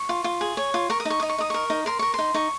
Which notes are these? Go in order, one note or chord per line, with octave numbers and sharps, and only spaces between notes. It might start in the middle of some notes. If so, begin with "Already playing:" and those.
Already playing: C#6
F4
F4
G#4
C#5
F4
A#4 C#6
D#6
D#4 C#6
D#4 D#6
C#6
D#4 D#6
A#4 C#6
D#4
A#4 C6
A#4 C#6
D#4 C6
D#4 C#6